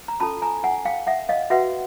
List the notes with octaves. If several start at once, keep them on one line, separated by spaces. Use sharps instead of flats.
A#5
C#4 F4 A4 A5 B5
G#5 A#5
F#5 G#5
F5 G5
E5 F#5
D#5 F5
F#4 B4 E5 F#5